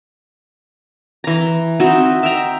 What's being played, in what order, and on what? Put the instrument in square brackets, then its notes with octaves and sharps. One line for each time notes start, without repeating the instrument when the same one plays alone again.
[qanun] E3 A#5
C4 D#4 F#4 E5
E5 G5 A#5